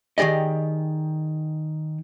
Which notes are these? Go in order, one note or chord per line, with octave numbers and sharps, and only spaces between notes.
D#3 G4 G#4 D5 D#5